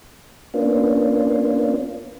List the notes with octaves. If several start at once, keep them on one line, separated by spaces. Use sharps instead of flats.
A#3 B3 C#4 D4 F4